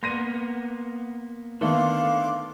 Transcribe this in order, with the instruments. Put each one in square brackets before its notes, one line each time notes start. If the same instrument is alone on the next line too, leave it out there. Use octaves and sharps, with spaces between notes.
[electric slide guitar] A#3 B3 [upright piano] C6 A#6 D#7
[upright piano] D#3 A3 B3 [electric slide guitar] D4 A4 [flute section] F5 C6 D6